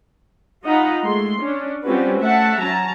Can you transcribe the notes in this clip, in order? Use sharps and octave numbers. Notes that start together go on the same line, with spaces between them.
D#4 F4 D#5 F#5 A#5 B5
G#3 A3 C6
C#4 D4
G3 C4 C#4 F4 F#4 B4
A3 E5 F#5 A5
F#3 C#4 A5 A#5